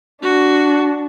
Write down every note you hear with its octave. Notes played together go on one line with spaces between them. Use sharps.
D4 F#4